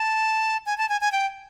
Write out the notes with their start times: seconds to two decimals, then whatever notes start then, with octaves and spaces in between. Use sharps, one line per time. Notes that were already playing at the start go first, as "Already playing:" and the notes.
Already playing: A5
0.66 G#5
0.78 A5
0.89 G#5
1.01 G#5
1.12 G5